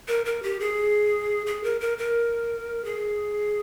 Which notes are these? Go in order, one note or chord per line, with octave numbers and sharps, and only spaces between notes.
A#4
A#4
G4
G#4
G#4
A#4
A#4
A#4
G#4